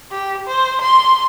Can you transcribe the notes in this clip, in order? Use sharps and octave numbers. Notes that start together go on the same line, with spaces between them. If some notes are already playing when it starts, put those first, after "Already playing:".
G4
C5
C6